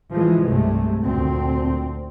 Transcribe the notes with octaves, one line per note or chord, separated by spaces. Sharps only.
E3 F3 G#3
C2 G2 C3 G#3 A3
D2 A#2 C4